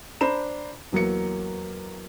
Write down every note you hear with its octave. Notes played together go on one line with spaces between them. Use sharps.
D4 C5 A#5 B5 E7
E2 F#3 A#3 C#7